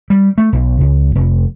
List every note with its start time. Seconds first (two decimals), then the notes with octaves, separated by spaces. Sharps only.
0.10 G3
0.38 A3
0.53 B1
0.80 C#2
1.15 F1